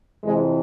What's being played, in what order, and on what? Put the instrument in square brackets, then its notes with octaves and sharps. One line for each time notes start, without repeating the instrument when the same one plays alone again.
[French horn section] F2 C3 E3 G#3